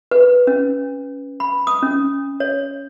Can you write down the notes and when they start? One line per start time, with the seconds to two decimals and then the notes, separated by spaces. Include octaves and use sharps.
0.11 B4
0.47 C#4
1.40 B5
1.67 D#6
1.83 C#4
2.40 C#5